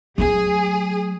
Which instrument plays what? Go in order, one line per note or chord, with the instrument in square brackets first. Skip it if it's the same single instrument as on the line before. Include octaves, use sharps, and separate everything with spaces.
[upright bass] F#3 A3 [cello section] G#4